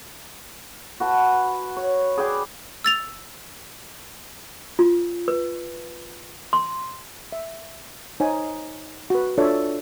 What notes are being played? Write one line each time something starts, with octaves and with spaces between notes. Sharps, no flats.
F#4 B4 A5
C#5
G#4 B4 D5 G5
E6 A6 F7
F4
B4
C6
E5
D#4 C5 C#5 G#5
F#4 B4
D4 F4 A4 C#5 D5 E5